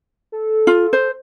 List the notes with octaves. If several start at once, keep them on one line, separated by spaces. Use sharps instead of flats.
A4
F4
C5